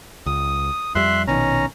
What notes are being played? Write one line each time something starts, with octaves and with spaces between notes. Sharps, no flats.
C#2 D#6
F2 G3 E5 C6 F#6
A#1 B2 D#3 C#4 A#5